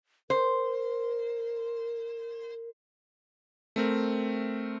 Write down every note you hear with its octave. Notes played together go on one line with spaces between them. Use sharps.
A#4 C5
A3 C4 A#4